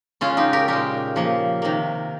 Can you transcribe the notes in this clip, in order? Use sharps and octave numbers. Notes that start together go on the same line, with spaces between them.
C#3 G#3 C#4 F4
D#4 G4
G4 A#4
A#2 G#3 G4 A#4
C#3 F3 A#3
C3 D#3 A#3